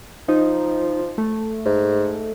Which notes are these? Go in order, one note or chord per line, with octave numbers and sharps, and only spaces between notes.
F3 D#4
A3
G#2